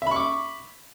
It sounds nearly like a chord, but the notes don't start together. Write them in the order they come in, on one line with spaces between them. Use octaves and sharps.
E5 B5 C#6 D6